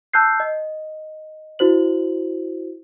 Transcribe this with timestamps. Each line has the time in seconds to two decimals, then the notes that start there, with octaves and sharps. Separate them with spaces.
0.14 A5 E6 F#6 G6 C7
0.40 D#5
1.59 E4 F#4 C5 F#7